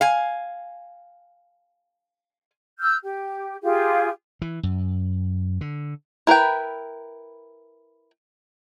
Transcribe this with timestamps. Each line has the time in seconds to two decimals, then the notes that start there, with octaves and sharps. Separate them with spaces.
0.01 F5 G#5
2.79 E6 F6 G6
3.04 G4
3.63 F4 G4 G#4
4.42 E3
4.63 F#2
5.61 D3
6.27 E4 A#4 B4 G5